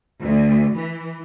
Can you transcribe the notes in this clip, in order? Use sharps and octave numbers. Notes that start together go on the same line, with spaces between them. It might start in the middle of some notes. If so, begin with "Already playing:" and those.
D2
E3